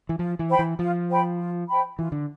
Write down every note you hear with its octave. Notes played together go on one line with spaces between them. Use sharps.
E3
F3 F4
E3
C5 G5 B5
E3
F3 F4
C5 G5 B5
F4
C5 G5 B5
E3 F4
D3